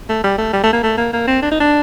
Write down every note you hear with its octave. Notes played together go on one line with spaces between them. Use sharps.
A3
G3
A3
G3
A3
A#3
A3
A#3
A#3
C4
D4
D#4
D4